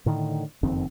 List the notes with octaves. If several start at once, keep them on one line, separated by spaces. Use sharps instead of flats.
A2 D3 D#3
F#1 F2 D#3 C4